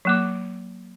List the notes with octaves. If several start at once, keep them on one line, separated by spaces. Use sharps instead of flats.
F#3 A#3 D6